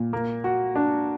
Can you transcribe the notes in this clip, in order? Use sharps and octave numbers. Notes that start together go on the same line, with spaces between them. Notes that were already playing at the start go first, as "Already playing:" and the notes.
Already playing: A#2
A#3
F#4
D4